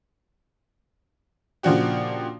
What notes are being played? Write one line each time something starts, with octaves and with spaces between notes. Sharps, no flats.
A#2 C#3 F3 D4 F#4 G4